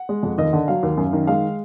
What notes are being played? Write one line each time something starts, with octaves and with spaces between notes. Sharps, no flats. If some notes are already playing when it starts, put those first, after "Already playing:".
Already playing: F#5
G#3
F2
D#2 D#5
D3
F#3 F5
D#2
F#2
D#3
G#3 F5